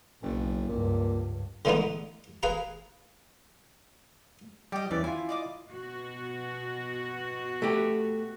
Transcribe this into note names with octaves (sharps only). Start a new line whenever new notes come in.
F#1 B1
C#2 G2 A#2
D3 E3 G#3 A3 B3 D#4
G#4 B4 F5 A#5
G3 G4 D#5
E2 E3 C#4 D5
E4 F4 G#5
D5 D#5 D6
B2 F#4
A3 G4